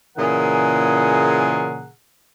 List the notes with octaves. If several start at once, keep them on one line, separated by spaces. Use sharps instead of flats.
A#2 C#3 E3 G#4 A#4 F#5